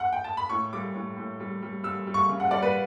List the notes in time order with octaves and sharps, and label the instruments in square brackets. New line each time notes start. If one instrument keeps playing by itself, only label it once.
[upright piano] F#5
G5
A5
B5
A2 C#6
G3 D6
A2
A2
G3
G3
G3 E6
G3
C#6
C#3
F#5
G3 D5
B4